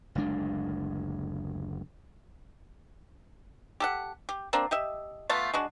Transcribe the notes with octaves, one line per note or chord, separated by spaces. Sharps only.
F#1 D2 G#3 D4
G4 A4 F#5
G4
A#3 C4 D4
G4 D#5 E5
A3 B3 F4 A5
G#3 D4 F#4